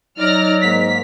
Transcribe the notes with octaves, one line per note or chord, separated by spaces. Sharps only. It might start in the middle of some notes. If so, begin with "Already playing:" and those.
F#3 D#4 D5 F6 A#6
G#2 A#3 B6